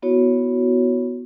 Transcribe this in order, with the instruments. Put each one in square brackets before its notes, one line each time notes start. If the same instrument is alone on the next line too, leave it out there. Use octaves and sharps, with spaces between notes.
[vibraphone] B3 E4 F#4 C#5